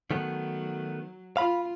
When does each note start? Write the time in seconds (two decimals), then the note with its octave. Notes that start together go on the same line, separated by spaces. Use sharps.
0.11 D#3 F#3 A3 B3
1.37 F4 F5 B5